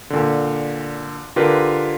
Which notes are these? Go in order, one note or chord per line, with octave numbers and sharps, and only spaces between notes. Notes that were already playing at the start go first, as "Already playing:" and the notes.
A#2 D3
D3 F4 G4 A#4 B4